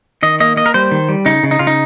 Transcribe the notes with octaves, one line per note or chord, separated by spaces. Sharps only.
D#3 D#5
A#3 D#5
A#3 D#5
A#4
G3 C5
D#3
G3
C#3 D#4
C#3
D#4
C#3 F4
D#4